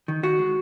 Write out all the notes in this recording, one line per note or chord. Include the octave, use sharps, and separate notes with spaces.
D#3
D#3 F#4
G#3